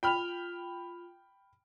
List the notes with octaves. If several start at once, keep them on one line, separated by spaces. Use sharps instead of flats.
F4 G5 B5 F6 F7